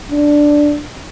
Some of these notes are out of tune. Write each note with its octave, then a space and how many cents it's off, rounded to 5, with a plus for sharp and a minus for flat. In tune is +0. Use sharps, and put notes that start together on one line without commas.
D4 +0